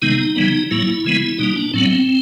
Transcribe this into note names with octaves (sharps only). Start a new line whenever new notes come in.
C3 D#3 G#3 B3 D#4
C#3 E3 G3 B3
A2 F#3 A#3 E4
C#3 E3 G#3 B3
B2 G3 A#3 D#4
D4
A2 F#3 B3 C4